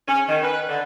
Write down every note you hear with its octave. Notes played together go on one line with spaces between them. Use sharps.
C#4
D#3
B4
D3